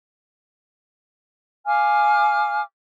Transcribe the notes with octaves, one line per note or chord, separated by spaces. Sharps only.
F5 G#5 D6 F6